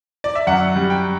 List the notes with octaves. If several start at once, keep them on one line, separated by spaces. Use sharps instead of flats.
D5
E5
F#2 F#5
G3
G5